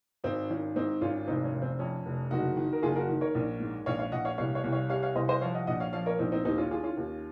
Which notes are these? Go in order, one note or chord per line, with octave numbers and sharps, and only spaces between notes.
G#1 C4 D#4
D#3 C#4
G#2 C4 D#4
G#1 C#4 F4
F1 C4 D#4
C#4
F1
C4
F2 C#4
F1
F#1 D#4 F#4
D#3
A#4
F#1 F4 G#4
F#4 A#4
D#3
A#4 C#5
A#1
G#2
A#1 C#5 F5
C#5 F5
A#1 D#5 F#5
C#5 F5
C2 C#5 F5
C#5 F5
C2
C#5 F5
C3 C#5 F5
C#5 F5
C2 C5 D#5
C5 D#5
F3 C#5 F5
D#5 F#5
A#1 D#5 F#5
C#5 F5
F3 C#5 F5
A#4 C#5
A#1 C4 D#4
C4 D#4
D#2 C4 D#4
C#4 F4
D#3 F4 G#4
C#4 F4
D#2